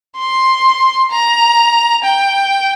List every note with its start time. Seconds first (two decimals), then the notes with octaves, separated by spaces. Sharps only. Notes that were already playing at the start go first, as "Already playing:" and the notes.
0.17 C6
1.11 A#5
2.04 G5